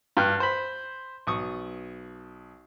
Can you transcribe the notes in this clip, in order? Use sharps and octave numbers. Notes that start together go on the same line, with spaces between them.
G2 G5 F6 F#6
C5 B5
B1 C#6 D#6